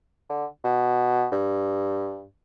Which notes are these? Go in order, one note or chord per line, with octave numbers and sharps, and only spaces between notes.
D3
B2
G2